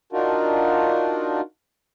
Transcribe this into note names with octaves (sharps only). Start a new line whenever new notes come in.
D4 D#4 F4 F#4 A#4